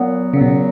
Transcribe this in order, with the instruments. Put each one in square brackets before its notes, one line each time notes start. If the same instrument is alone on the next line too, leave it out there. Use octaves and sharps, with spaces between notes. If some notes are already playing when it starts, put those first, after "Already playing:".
Already playing: [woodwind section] A#2 F#3 B3
[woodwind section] A#2 F#3 B3 [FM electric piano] C#3
[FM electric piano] B2
C#3